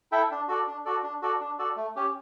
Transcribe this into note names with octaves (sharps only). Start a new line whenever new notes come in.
E4 A4 E5 G5
D4
F#4 A4 D5
D4
F#4 A4 D5
D4
F#4 A4 D5
D4
F#4 A4 D5
A3
C#4 G4